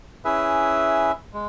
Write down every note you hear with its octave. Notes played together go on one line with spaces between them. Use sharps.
C#4 E4 G#4 B4 E5
G#3